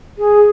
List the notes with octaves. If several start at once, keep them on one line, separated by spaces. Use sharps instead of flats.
G#4